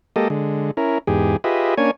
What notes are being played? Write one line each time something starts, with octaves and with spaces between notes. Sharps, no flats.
G#3 A#3 G4 A4 D#5
D3 G#3
C#4 E4 A#4
E2 G#2 G4 G#4
F4 G4 G#4 B4 D#5 E5
A#3 C#4 D4 C#5 G#5